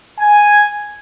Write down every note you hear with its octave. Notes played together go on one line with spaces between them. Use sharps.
G#5